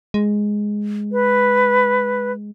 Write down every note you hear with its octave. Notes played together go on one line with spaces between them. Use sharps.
G#3
B4